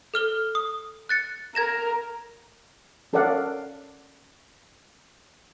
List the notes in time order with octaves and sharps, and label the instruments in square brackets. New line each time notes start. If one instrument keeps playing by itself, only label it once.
[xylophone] A4 F6 G7
D#6
F#6 A6 C#7
[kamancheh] A#4 [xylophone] G#6 A#6 E7
[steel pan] C#4 A4 A#4 D5 F5 F#5